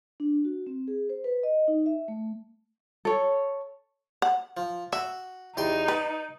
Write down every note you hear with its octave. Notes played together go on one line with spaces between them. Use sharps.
D4
F#4
C4
G#4
C5
B4
D#5
D#4
E5
A3
A4 C#5
F#5
F3
F#4 E5
E2 D#4 G4 C6
B4 D5